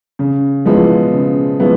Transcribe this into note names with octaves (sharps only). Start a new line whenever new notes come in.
C#3
F3 G#3 B3 E4
C#3
F3 G#3 B3 E4